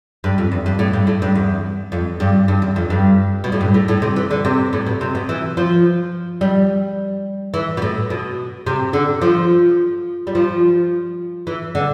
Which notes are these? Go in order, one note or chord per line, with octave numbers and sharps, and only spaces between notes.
G2
F2
E2
G2
A2
G2
A2
G2
E2
F2
G2
G2
E2
F2
G2
B2
A2
G2
A2
A2
C3
E3
D3
C3
A2
B2
C3
B2
E3
F3
G3
E3
B2
A2
B2
C3
D3
F3
G3
F3
E3
D3